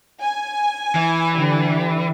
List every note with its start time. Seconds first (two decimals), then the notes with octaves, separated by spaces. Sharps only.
0.22 G#5
0.95 E3
1.37 D3 G3